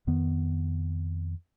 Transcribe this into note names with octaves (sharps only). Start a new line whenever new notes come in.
F2 D#3 B3